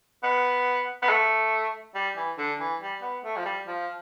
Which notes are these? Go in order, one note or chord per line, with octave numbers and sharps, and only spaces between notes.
B3
B3
A3
G3
E3
D3
E3
G3
B3
A3
F3
G3
F3